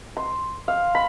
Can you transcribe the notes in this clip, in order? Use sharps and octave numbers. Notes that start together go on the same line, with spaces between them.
C6
F5
B5